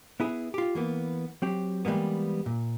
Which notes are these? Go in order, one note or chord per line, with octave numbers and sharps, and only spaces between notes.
B3 E4 G#4
F4 G4
E3 A#3 B3
F#3 C4 G4
E3 G3 G#3 A#3 B3
A#2